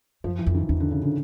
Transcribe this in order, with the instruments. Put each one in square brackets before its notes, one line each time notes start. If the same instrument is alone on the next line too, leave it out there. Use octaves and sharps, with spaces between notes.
[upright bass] F#2 [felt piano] F3
[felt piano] E3
[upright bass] F2
[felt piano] D#3
[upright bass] E2 [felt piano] D#3
[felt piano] D3
C#3
D3